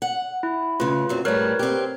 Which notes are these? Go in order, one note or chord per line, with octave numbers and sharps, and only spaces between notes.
F#5
E4
A2 C#3 F4 B4
F#2 F#3 C4
A2 G3 A#4 B4 C#5
C4 G4